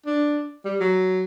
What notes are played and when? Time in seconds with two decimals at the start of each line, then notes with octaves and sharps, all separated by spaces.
0.06 D4
0.65 G3
0.80 F#3